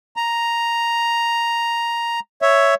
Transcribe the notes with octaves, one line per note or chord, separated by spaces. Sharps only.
A#5
C#5 E5